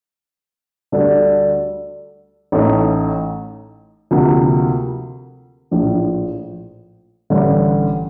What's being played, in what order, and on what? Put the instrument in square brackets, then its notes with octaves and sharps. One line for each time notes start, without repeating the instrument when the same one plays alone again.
[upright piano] D2 D3 G3 D4 A4
A1 A2 A3 D#4
D2 C3 F3 A#3
A#1 A2 F3
A1 G2 D3